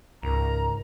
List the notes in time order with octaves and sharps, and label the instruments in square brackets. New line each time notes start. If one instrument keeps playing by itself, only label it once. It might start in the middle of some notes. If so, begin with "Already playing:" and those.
[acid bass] C#2 [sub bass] G#2 [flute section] A#4 A#5